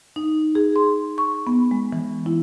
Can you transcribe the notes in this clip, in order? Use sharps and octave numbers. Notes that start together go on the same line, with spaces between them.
D#4
G#4
C6
C#6
B3
G#3
E3
E4